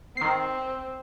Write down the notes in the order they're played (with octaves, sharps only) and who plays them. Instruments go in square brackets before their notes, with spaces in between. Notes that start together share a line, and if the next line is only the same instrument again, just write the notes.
[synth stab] D#3 C7 [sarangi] C4